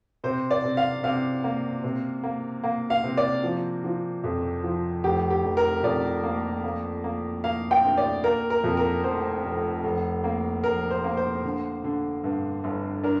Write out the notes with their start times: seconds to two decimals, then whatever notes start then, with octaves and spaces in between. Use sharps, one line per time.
0.24 C3 C5
0.51 D5
0.64 C3
0.77 F5
1.04 C3 F5
1.44 A#3
1.84 C3
2.23 A#3
2.63 A#3
2.90 F5
3.04 C3
3.17 D5
3.44 F3
3.84 F3
4.24 F2
4.64 F3
5.04 F1 G4
5.30 G4
5.44 F1
5.57 A#4
5.83 F2 D5
6.23 A#3
6.64 A#3
7.04 A#3
7.44 A#3 F5
7.71 G5
7.84 D2
7.97 D5
8.24 A#3 A#4
8.50 A#4
8.64 F2
8.77 A#4
9.04 F1 C5
9.44 F1
9.84 F1
10.24 A#3
10.64 F1 A#4
10.91 C5
11.04 A#3
11.17 C5
11.44 D3
11.84 D3
12.24 G2
12.64 G1
13.03 D4 A#4